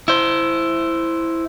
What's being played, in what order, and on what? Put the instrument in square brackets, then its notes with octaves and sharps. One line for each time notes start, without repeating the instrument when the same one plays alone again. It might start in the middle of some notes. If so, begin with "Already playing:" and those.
[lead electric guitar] E4 C5